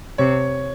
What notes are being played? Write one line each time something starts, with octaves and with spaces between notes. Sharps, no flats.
C3 C#5